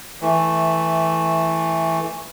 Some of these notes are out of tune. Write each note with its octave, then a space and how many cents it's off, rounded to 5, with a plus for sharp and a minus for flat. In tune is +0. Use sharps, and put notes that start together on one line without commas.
E3 -5 A3 +0